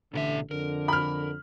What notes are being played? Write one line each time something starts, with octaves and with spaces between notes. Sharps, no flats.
A1 B2 D3 A4 E5
F2 D3 A#4
B5 F6